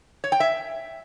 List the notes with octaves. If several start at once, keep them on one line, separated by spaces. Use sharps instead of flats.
C#5
G5
E5